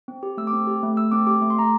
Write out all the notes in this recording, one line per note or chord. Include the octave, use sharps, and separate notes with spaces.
C4
G4
A3 E6
D6
C4
G4
A3
A3 E6
C4 D6
G4 D6
A3 D6
C6
A3 A#5